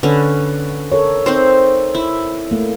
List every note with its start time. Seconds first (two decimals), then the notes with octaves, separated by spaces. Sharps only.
0.03 D3 C#4 B4
0.92 A4 A#4 C#5
1.26 C4 D#4 C5
1.95 E4
2.51 A3 A#3